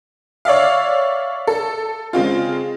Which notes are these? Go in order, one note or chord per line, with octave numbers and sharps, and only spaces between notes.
C#5 D5 E5 F5
A4
C#3 G#3 C4 F4